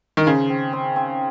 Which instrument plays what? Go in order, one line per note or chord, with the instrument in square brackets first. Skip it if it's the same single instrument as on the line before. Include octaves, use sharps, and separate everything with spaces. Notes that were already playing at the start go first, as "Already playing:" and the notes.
[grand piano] D#3
[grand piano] C#3 [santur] C5
[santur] C4
C4
C4